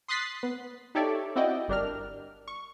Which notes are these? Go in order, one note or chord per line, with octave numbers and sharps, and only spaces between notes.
C6 D#6 F#6 A6 B6 C7
B3
D#4 G4 A4 C#5 D5 E5
C4 E4 F#4 D5 D#5 G5
G1 G3 D4 A#4 F6
C#6